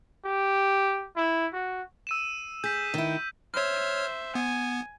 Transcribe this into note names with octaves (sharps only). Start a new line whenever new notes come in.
G4
E4
F#4
E6 D#7 E7
G#4 G6 B6
D#3 E4
C5 C#5 E5 F6
B3 G#5